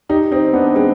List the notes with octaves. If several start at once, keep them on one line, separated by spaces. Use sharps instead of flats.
D#4 G4
C4 D#4
B3 D4
G#3 C4